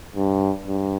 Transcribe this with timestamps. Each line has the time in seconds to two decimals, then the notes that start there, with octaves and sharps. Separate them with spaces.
0.16 G2
0.67 G2